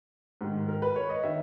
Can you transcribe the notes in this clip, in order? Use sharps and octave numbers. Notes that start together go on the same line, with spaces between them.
G#2 D#3
A#4
B4
C#5
D#5
D#3 E5